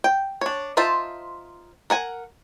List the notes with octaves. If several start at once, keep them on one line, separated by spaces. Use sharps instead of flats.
G5
D4 C#5
D#4 F4 C5 E5 A5
A#4 F#5 G#5